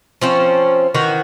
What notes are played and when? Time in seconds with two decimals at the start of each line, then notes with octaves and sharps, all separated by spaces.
0.21 F3 C4 C#4
0.94 D#3 E3 F#4